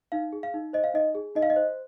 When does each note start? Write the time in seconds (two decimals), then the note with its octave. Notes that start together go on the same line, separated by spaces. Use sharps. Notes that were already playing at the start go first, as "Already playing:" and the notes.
0.12 D#4 F5
0.33 G#4
0.43 F5
0.54 D#4
0.73 C5 D#5
0.84 F5
0.94 D#4 D#5
1.15 G#4
1.35 D#4 D#5
1.43 F5
1.50 D#5
1.56 C5